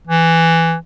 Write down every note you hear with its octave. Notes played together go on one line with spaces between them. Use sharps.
E3